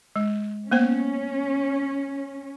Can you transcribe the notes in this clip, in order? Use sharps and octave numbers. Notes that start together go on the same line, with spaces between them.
G#3
A#3 B3 C#4 C5